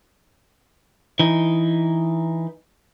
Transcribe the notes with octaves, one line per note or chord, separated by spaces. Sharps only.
E3 D#4